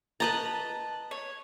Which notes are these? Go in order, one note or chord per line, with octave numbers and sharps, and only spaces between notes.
B4 D#5 A5 A#5
C#5